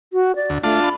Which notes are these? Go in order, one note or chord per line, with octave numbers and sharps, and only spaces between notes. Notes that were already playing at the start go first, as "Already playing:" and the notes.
F#4
D5
D2
A3 D4 F4 A5
B5